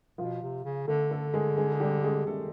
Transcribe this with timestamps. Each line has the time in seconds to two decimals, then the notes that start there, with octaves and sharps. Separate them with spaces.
0.18 B2 F3 F4
0.42 C3
0.65 C#3
0.87 D3 A3 A4
1.11 A3 A4
1.34 G#3 G#4
1.57 G#3 G#4
1.72 G#4
1.80 G3 G4
2.03 G#3 G#4
2.26 D#3 A3 A4